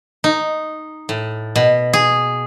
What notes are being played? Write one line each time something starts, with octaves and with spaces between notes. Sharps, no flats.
D#4
A2
B2
G#4